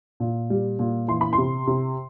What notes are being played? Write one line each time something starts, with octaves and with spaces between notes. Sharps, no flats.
A#2
G3
A#2
E3 C6
B5
C6
C3
C3